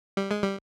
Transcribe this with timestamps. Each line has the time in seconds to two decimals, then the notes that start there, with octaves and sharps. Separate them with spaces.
0.17 G3
0.31 G#3
0.43 G3